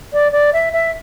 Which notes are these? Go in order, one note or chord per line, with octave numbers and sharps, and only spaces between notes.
D5
D5
E5
E5